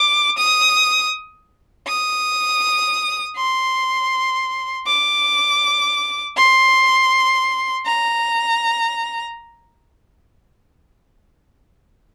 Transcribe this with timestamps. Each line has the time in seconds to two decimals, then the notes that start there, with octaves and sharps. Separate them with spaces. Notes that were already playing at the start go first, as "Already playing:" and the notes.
Already playing: D6
0.38 D#6
1.87 D#6
3.37 C6
4.87 D6
6.37 C6
7.86 A#5